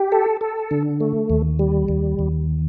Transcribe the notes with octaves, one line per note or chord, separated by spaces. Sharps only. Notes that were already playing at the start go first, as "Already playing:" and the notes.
Already playing: G4
A4
A4
D3
A3
D#2
G3
D#2
D#2